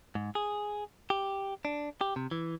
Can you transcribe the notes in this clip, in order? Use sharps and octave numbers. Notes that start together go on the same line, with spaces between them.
G#2
G#4
G4
D4
G4
C3
E3